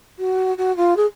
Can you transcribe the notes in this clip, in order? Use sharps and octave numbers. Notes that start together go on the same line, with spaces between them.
F#4
F#4
F4
G#4